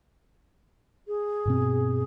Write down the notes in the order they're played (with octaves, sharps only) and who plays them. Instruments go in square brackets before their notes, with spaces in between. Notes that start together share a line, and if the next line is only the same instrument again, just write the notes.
[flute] G#4
[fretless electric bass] G2 B2 C4